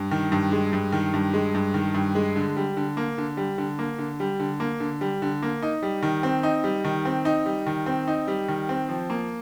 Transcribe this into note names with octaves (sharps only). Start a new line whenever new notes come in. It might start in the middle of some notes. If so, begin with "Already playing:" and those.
Already playing: G2
D#3
G2
G#3
G2
D#3
G2
G#3
G2
D#3
G2
G#3
D3
G3
D3
A#3
D3
G3
D3
A#3
D3
G3
D3
A#3
D3
G3
D3
A#3
D#4
G3
D#3
C4
D#4
G3
D#3
C4
D#4
G3
D#3
C4
D#4
G3
D#3
C4
F3
A#3